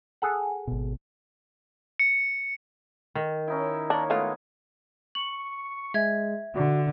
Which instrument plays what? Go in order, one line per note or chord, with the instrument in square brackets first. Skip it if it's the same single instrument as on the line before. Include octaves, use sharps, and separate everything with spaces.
[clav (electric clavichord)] G#4 A4 F#5
[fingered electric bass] G#1 B2
[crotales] C#7
[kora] D#3
[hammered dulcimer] C#4 D#4 E4
[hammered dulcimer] A#3 C#5 [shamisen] D4
[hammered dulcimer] G#3 B3 [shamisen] A3 F4
[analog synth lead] C#6 [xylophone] F#7
[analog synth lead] G#3 [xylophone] E5 G#6
[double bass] D3 [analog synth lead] F#4